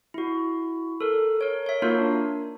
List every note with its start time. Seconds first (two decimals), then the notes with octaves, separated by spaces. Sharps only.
0.14 E4 F#4
1.01 A4 A#4
1.41 A#4 C#5
1.66 C#5 E5
1.82 A#3 D#4 F4 F#4 A#4
1.98 D4